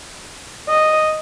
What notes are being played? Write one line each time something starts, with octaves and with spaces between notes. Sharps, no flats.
D#5